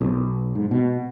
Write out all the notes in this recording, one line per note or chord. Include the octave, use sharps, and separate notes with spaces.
B1
G#2
B2